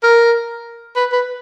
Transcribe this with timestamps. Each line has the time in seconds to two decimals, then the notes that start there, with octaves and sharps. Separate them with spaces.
0.03 A#4
0.96 B4
1.12 B4